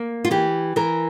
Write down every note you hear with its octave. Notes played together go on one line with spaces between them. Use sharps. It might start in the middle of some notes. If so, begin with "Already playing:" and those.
Already playing: A#3
F4
E3 G4
E3 A#4